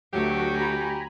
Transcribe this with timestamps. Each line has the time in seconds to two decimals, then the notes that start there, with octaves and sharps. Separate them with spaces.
0.13 D2 F#3 A3 F#4 G4
0.52 G#5 A#5 B5